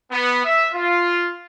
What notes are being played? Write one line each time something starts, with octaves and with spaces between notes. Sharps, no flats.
B3
E5
F4